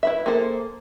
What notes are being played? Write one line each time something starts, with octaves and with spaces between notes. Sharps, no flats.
E4 B4 E5
A#3 G#4 A4 C5